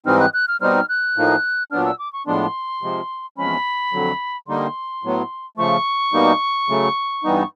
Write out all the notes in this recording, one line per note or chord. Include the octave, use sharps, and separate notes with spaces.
G#2 E3 G3 C4 D#4 F6
F#6
F#6
F6
B2 G3 C4 D#4 F6
F#6
A2 F3 A#3 D#4
A#2 F#3 B3 D4 F6
E6
D6
C#6
A2 F3 G#3 B3 D4 C6
C3 F3 G#3
E2 C3 F3 G#3 C#4 B5
F2 D3 F#3
D3 G3 A#3 D#4 C6
A2 F#3 B3
C#3 F3 A3 C#6
B2 G3 A#3 D#4
C#3 F#3 A3
G2 E3 G3 B3 D#4